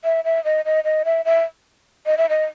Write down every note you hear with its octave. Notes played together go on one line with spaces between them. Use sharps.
E5
E5
D#5
D#5
D#5
E5
E5
D#5
E5
D#5